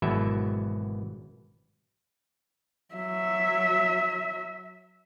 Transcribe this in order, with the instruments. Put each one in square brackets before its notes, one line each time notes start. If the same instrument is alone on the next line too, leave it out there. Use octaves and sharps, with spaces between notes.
[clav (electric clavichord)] G#1 B2 E3 F#3 E5
[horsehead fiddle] F#3 E5